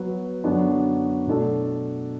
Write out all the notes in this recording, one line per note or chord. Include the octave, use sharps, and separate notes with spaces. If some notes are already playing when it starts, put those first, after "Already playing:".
Already playing: F#3 B3 F#4 B4
F#2 D3 B3 D4 F#4
B2 A3 D4 A4